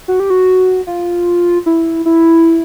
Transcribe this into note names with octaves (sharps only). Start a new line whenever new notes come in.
F#4
G4
F#4
F4
E4
E4